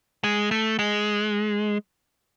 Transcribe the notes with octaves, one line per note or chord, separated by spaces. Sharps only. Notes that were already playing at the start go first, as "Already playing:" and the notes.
G#3
A3
G#3